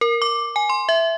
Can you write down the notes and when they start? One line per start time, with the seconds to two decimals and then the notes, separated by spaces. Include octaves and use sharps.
0.01 A#4
0.22 D6
0.56 G#5
0.70 C6
0.89 E5